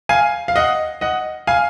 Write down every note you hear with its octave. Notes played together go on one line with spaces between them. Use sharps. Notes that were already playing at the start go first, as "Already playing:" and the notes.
F5 G#5
F5
D#5 F#5
D#5 F#5
F5 G#5